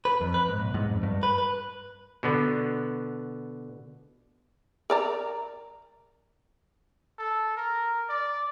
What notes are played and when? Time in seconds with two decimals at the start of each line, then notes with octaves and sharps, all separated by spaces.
0.05 B4
0.21 F2
0.34 B4
0.49 G#2
0.60 B1
0.74 G#2
0.89 F2
1.03 G2
1.23 B4
1.38 B4
2.23 B2 D3 B3
4.90 A#4 D5 A#5
7.18 A4
7.57 A#4
8.09 D5